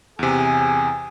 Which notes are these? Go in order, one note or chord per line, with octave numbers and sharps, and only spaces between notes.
E2 C3 G#4